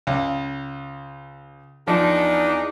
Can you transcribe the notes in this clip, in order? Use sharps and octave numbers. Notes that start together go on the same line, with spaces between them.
C#2
E2 F3 D4 D#4